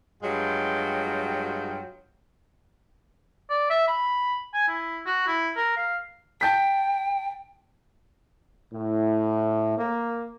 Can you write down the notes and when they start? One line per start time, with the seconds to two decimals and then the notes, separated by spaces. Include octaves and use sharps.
0.22 G2 F#3 G#3 F4 G5
3.50 D5
3.70 E5
3.88 B5
4.53 G#5
4.68 E4
5.06 F#4
5.27 E4
5.56 A#4
5.77 F5
6.41 G5 A5 G6 B6
8.73 A2
9.79 A#3